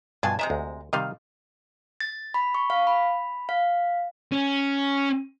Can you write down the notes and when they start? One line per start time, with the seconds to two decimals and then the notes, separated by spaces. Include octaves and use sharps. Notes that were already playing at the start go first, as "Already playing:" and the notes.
0.23 G2 B2 F3 D4 G#5 A5
0.39 C3 G#3 D5 E5 A#5
0.50 D2
0.93 C3 D#3 G3 D#5 F5
2.00 A6
2.34 B5
2.55 C#6
2.70 F5
2.87 B5
3.49 F5
4.32 C#4